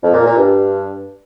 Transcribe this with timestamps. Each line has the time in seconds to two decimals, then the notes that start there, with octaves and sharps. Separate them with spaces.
0.02 F2
0.14 A#2
0.25 A#2
0.36 G2